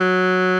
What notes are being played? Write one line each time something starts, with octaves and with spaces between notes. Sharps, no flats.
F#3